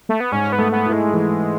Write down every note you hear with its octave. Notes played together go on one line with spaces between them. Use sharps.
A3
B3
G#2 C#4
B3
A3
B3
E4
G#3
E3